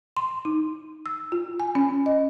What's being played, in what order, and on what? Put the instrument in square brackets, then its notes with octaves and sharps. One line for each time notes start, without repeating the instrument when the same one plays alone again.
[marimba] C6
D#4
E6
F4
G#5
C#4
D#5